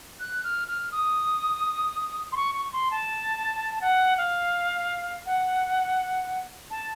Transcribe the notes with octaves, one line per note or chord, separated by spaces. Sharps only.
F#6
F6
F6
D#6
C6
C#6
C#6
C6
A5
A5
F#5
F5
F#5
A5